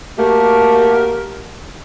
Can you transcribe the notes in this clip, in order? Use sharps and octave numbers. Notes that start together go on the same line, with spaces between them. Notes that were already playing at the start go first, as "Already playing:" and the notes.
A3 A#3 F#4 G4 A#4